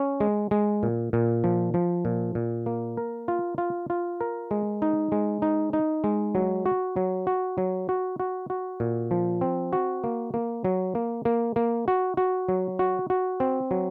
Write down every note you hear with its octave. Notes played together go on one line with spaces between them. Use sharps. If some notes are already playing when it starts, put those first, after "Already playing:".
Already playing: C#4
G#3
G#3
A#2
A#2
F3
F3
A#2
A#2
A#3
A#4
F4
F4
F4
A#4
G#3
D#4
G#3
D#4
D#4
G#3
F#3
F#4
F#3
F#4
F#3
F#4
F#4
F#4
A#2
F3
C4
F#4
A#3
A#3
F#3
A#3
A#3
A#3
F#4
F#4
F#3
F#4
F#4
C4
F#3